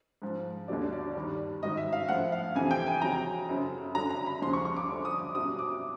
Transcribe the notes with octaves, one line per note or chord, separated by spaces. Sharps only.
G#2 F3
D#2 D3 F#3 D5
D5
G2 D#3 G3
G#2 D#3 F#3 D#5
E5
F5
A2 F3 F#5
F5
F2 C3 E3 G#5
G5
G#5
F2 C#3 F#3 A#5
F#2 C#3 F#3
F#2 D3 F#3 A#5
A#5
B5
D#2 C#3 F3 C6
C#6
C#6
D6
F#2 D3 F3
D#6
D6
C2 B2 F#3 D#6
D6